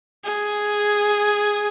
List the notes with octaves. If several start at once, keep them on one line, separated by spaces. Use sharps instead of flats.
G#4